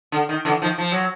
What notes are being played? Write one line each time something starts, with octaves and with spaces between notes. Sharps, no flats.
D3
D#3
D3 E3
D#3 F3
F3
F#3